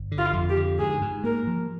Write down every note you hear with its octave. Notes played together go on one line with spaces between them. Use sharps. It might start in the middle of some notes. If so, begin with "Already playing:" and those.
Already playing: G1
D3
F4
F2
G4
D3
G#2 G#4
G#2
A#3 A#4
F3